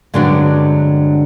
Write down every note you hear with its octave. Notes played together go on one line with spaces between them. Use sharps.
G2 D3 F#3 G#3 C4 D4